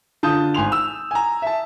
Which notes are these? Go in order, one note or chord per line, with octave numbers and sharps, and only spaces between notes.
D3 F4 A5 D#6 G6
G#1 G#5 C6 F7
E6
G#5 A#5
E5 A5